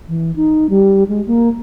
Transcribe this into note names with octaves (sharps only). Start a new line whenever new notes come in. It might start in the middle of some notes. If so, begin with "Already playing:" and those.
E3
D#4
G3
G#3
A#3